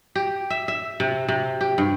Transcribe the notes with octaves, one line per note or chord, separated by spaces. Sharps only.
G4
E5
E5
C3
C3
G4
G2